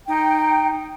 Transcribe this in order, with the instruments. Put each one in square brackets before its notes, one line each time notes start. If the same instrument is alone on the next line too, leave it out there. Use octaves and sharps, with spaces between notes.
[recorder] D#4 [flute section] G5